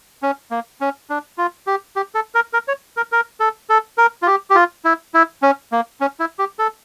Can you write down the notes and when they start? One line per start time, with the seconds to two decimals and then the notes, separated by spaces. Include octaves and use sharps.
0.22 C#4
0.51 A#3
0.81 C#4
1.10 D4
1.38 F4
1.67 G4
1.96 G4
2.15 A4
2.35 A#4
2.53 A#4
2.68 C#5
2.97 A#4
3.12 A#4
3.40 A4
3.69 A4
3.98 A#4
4.22 F4
4.27 G4
4.50 G4
4.55 F4
4.85 E4
5.14 E4
5.42 C#4
5.72 A#3
6.01 C#4
6.20 E4
6.39 G4
6.59 A4